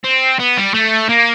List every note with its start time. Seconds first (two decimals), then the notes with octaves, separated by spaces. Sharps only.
0.04 C4
0.39 B3
0.57 G3
0.74 A3
1.10 A#3